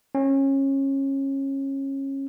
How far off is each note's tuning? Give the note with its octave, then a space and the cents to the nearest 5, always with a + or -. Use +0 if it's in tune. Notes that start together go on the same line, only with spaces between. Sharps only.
C#4 -25